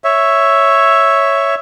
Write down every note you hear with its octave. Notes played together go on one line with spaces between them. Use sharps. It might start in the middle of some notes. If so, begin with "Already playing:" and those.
C#5 E5